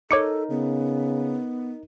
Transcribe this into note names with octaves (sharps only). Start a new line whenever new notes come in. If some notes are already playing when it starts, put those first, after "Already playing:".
D#4 A4 A#4 C#5 D6 C#7
C#3 B3